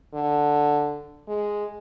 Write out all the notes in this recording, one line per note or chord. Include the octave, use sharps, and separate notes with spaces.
D3
G#3